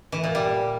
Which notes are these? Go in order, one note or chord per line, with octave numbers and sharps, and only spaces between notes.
E3
A#2
G3